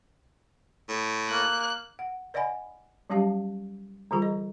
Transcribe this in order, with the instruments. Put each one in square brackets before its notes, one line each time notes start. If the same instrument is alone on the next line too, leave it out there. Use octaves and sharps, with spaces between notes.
[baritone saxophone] A2
[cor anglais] A#3 [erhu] F#6
[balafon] F#5
B4 D5 D#5 F#5 G#5 B5
F#3 G3 C#4 G4 F5 A5
D3 E3 G3 F4 G#4 A#5
D#5